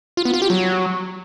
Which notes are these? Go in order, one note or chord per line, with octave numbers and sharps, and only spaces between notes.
F4
B3
F4
G4
F#3